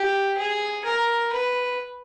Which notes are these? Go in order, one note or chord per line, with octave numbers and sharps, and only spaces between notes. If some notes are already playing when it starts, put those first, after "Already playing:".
Already playing: G4
G#4
A#4
B4